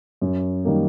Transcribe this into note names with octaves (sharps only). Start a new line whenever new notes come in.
F#2
D#3 G3 A#3